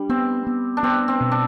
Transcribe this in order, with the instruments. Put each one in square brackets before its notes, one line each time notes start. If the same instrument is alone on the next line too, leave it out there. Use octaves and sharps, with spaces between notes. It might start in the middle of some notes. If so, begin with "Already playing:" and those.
Already playing: [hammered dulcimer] G3 [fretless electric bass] D4
[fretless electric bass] B3 [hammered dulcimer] C4
[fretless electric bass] B3
[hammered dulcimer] D4
[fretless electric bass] B3 [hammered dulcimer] C4
[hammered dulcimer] C4
[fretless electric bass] B2
[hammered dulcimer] D4